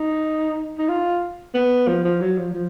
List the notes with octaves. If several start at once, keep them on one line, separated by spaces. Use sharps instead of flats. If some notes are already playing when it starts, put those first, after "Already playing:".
Already playing: D#4
D#4
F4
B3
F3
F3
F#3
F3
F3